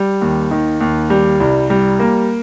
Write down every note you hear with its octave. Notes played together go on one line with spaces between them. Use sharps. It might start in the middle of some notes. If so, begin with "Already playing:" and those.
Already playing: G3
D#2
D#3
D#2
G3
C2
G3
A#3